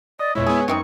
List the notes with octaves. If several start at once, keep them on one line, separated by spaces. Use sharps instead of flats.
D5 D#5
E2 A#2 G#3 E4 C#5
G#3 B3 G#4
F#2 E3 C4 D#4 C#6